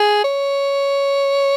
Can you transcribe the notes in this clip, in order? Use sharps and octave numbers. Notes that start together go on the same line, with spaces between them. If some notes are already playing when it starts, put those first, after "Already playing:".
Already playing: G#4
C#5